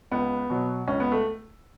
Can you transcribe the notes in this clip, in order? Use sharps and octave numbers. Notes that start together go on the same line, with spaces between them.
C#2 B3
B2 F#3
C#2 C#4
B3
A3